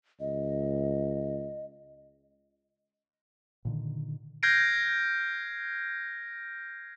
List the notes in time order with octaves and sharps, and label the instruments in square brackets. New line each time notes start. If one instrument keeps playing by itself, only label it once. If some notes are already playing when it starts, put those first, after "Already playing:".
[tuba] C#2 [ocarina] D#5
[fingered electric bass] A#2 D3 D#3
[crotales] F6 G6 G#6 A#6 C7 D7